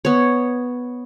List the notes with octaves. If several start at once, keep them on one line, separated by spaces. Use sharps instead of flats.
B3 C#5